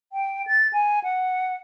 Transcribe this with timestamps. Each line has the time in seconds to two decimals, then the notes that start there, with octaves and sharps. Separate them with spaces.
0.13 G5
0.47 A6
0.73 G#5
1.04 F#5